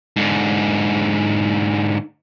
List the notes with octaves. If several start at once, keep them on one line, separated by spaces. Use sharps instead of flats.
G#2 D3